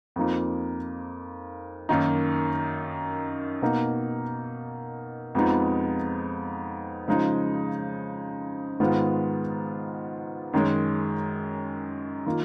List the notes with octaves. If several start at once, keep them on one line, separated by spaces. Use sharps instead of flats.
F2 F3 A#3 D#4
F#2 D#3 A#3 D#4
B2 A#3 D#4
F2 F3 G#3 B3 D#4
C#3 F3 G#3 D#4
G#2 D#3 G#3 B3 F4
F#2 D#3 G#3 C#4
D#3 A#3 F4